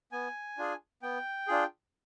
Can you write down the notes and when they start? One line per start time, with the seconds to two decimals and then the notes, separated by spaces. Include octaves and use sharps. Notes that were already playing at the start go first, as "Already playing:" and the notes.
0.12 B3 G#5
0.58 D4 F4 G#4
1.02 B3 G5
1.48 D4 F4 G#4